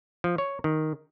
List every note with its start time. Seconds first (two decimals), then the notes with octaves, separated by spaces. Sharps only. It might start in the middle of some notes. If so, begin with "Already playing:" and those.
0.24 F3
0.38 C#5
0.64 D#3